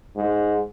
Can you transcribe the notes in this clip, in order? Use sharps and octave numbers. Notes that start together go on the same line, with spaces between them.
G#2